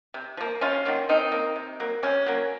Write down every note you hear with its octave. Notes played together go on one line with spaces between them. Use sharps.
C3
F3 A#3
C3 C#4 F4
D#3 F#3 A#3
D#3 C4 D#4
A#3
C3
F#3 A#3
C3 C#4
F#3 A#3